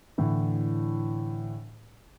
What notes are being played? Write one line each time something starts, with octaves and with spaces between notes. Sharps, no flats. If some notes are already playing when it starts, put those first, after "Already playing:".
A2 D3 E3